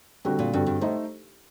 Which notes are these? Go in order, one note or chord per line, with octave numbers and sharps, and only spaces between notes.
A2 D3 G3 C4 F#4 A4
A#2
G2 D3 G3 C4 F#4 A4
G2
A2 A3 D#4 A4 C5